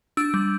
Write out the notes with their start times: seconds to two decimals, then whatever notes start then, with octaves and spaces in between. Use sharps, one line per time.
0.17 D4 E6
0.34 G3